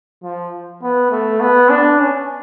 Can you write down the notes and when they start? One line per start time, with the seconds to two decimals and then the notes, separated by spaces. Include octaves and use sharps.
0.23 F3
0.82 B3
1.11 A3
1.40 B3
1.69 D4
1.99 C#4